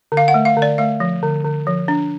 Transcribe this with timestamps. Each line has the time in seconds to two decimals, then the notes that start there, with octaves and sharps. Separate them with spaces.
0.12 D3
0.17 F5
0.28 F#5
0.34 A3
0.45 F5
0.57 D3
0.62 D5
0.78 A3 F5
1.00 F3
1.23 D3
1.44 D3
1.67 F3
1.88 D4